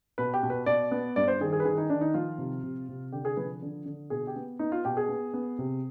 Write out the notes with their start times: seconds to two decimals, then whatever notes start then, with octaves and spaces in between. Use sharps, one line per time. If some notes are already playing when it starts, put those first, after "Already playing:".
0.18 B2 B4
0.34 G4
0.43 B2
0.50 B4
0.66 B2 D5
0.91 B3
1.16 G2 D5
1.28 C5
1.41 D#3 G#4
1.53 G#4
1.60 B4
1.65 D#3 G#4
1.78 D#4
1.90 D#3 D4
2.01 D#4
2.14 F3 F4
2.38 C3
2.63 C3
2.88 C3
3.12 D3 G4
3.25 G#4
3.37 F3 B4
3.62 D3
3.86 D3
4.10 B2 G#4
4.27 G4
4.36 B3
4.59 B3 D#4
4.72 F4
4.85 B2 G4
4.97 G#4
5.08 B3
5.34 B3
5.58 C3